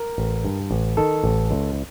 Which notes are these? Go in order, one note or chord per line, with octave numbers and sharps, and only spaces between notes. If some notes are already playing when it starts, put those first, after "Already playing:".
Already playing: A#4
A1
G2
A1
D#3 A4
A1
C#2